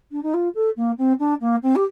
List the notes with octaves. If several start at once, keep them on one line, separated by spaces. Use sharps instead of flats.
D4
D#4
F4
A4
A#3
C4
D4
A#3
C4
G4